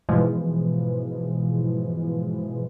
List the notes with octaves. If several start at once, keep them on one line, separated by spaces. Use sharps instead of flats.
G#2 B2 E3 F3 G#3